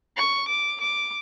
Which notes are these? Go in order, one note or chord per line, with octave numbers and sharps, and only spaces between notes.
C#6
D6
D6